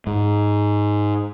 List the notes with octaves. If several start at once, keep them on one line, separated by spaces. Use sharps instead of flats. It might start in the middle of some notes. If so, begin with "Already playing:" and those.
G#2